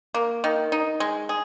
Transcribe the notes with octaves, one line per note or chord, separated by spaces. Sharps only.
A#3
D#3
D#4
G#3
G#4